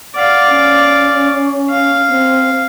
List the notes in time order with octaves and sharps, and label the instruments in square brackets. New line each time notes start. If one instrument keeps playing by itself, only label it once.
[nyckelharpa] D5 F5 [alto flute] F#5
[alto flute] C#4
[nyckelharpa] F5
[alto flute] C4